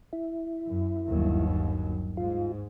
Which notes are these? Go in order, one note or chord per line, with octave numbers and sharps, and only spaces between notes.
E4
F#2
G1 D#2 F#3
G#2 F4